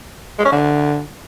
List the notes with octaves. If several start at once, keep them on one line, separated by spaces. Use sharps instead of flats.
G#3
C#4
D3